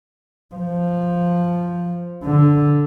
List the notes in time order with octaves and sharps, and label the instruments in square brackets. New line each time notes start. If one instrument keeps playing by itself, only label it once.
[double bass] F3
D3